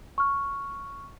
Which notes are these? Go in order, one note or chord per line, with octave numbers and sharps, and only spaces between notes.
C#6 F6